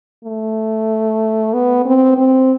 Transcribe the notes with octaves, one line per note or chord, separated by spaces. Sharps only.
A3
B3
C4
C4